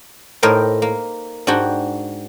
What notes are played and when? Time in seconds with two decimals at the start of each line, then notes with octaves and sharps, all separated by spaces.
0.42 A2 D#4 A#4 C5 G5
0.82 A#3
1.47 G#2 D4 F#4 G5